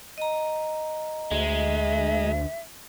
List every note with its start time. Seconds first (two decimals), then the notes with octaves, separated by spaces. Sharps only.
0.18 D#5 A#5
1.31 D2 G#3 E5